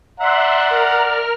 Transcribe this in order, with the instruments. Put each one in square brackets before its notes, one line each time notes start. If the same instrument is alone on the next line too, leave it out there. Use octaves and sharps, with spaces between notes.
[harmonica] D5 F#5 A#5 [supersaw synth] E5 C6 F#6
[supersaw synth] A#4 F6